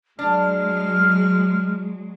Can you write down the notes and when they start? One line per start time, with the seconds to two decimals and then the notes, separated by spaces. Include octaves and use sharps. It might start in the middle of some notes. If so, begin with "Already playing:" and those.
0.19 F#3 G#3 D4 F6